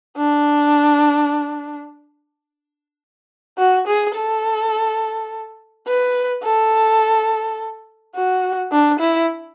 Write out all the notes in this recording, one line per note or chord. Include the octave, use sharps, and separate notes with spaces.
D4
F#4
G#4
A4
B4
A4
F#4
D4
E4